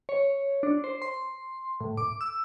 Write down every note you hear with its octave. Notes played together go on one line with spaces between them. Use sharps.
C#5
D4
C5
C6
A2
D6
E6